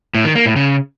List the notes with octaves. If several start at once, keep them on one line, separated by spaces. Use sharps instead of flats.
A2
D#3
A#3
A2
C#3